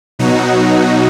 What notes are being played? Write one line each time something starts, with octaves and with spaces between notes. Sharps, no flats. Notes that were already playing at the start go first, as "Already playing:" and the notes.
B2 F#3 D#4 F#4